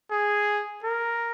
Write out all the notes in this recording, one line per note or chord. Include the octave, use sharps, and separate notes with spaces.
G#4
A#4